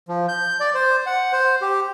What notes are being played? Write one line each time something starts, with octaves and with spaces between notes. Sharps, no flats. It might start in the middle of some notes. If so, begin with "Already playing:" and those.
F3
G6
D5
C5
F#5
C5
G4